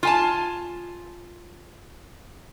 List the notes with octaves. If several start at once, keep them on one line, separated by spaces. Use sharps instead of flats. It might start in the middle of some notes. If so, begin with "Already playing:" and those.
F4 G#5 A5